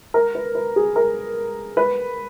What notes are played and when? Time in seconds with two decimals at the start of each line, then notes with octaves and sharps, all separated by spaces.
0.14 A#4
0.35 B4
0.55 B4
0.76 G#4
0.96 A#4
1.77 B4